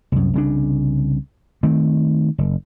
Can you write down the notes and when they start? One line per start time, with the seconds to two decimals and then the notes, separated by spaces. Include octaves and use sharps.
0.12 C2 F#2
0.33 C2 C#3 D4
1.63 D#3 A3 C4
2.38 F#1